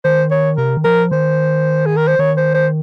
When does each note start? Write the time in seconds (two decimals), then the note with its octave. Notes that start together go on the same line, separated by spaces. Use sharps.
0.04 D#3 C5
0.31 C#5
0.57 C3 A#4
0.77 D#3
0.85 F3 A#4
1.11 D#3 C5
1.86 G#4
1.97 A#4
2.07 C5
2.19 D#3 C#5
2.37 C5
2.54 C5